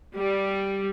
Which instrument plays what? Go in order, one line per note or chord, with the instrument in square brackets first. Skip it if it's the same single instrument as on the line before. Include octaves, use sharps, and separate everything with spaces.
[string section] G3